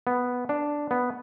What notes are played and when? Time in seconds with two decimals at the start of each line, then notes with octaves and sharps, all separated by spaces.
0.07 B3
0.49 D4
0.91 B3